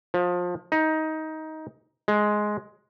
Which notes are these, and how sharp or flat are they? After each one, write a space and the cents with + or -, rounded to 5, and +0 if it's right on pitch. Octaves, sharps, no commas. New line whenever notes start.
F3 +25
D#4 +15
G#3 +10